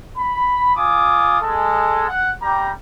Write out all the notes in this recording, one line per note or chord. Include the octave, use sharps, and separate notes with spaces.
B5
F4 G#5 D6 D#6
G#3 A4
F#5
G3 G4 A#5